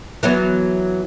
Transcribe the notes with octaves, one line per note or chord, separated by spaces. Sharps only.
E3 F#3 B3